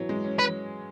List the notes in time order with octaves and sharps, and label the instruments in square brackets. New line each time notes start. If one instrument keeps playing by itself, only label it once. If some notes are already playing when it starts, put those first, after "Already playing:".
Already playing: [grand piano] E3 F#3
G#3
C#4
[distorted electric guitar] B4